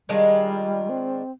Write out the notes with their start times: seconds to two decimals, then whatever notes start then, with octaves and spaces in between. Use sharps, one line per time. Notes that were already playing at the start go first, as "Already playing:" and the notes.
0.09 D#3 G3 G#3 D4 F4
0.89 C4